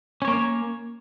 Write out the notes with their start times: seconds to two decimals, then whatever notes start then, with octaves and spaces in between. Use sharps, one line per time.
0.22 C#4
0.25 C#5
0.28 A#3